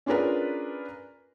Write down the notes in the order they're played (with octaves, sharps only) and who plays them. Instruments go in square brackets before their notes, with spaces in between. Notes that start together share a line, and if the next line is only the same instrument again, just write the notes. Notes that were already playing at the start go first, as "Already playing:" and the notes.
[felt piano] C#4 D4 F4 G#4 A#4 B4